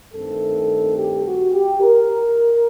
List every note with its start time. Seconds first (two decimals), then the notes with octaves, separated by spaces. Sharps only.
0.12 G2 D#3 A3 C4 A4
0.97 G4
1.24 F#4
1.52 G4
1.81 A#4